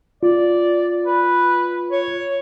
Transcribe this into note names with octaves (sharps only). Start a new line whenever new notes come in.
F4 D5
B4
C#5